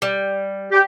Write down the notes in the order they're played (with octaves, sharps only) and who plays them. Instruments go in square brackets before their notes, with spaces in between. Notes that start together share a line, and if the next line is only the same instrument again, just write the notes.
[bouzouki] G3
[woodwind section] G4